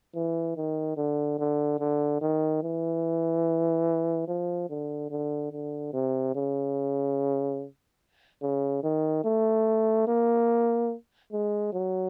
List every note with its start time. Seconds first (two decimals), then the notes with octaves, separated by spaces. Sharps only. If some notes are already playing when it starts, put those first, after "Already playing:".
0.15 E3
0.56 D#3
0.97 D3
1.39 D3
1.79 D3
2.21 D#3
2.63 E3
4.28 F3
4.70 D3
5.10 D3
5.52 D3
5.93 C3
6.35 C#3
8.42 C#3
8.83 D#3
9.24 A3
10.07 A#3
11.32 G#3
11.73 F#3